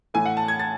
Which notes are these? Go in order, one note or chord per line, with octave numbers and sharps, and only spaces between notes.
A2 E3 A3 G#5
F#5
A5
G#6
A6